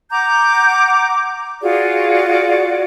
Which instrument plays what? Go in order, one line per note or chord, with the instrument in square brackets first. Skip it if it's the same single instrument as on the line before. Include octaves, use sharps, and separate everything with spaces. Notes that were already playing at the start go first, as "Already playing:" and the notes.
[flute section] F#5 A#5 D6 G6
F4 F#4 G#4 D5